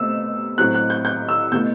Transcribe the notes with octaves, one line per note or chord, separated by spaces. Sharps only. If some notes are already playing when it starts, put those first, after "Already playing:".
Already playing: B2 A3 C4 E6
A2 F#3 C4 F#6
F#6
G6
G6
E6
B2 A3 E4 G6